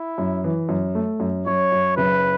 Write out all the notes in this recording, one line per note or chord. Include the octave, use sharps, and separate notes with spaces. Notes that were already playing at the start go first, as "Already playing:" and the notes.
Already playing: E4
F#2
E3
F#2
A3
F#2
F#2 C#5
F#2
F#1 B4